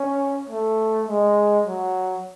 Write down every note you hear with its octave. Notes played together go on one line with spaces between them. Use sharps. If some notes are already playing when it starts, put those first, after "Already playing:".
Already playing: C#4
A3
G#3
F#3